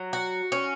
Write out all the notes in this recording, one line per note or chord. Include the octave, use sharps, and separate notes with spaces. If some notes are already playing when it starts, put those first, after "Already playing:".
Already playing: F#3
F#4
C#4